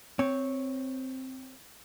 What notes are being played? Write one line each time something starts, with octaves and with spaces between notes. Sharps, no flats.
C4 C#5